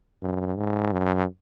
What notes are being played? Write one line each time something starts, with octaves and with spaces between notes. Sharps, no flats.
F#2
G#2
F#2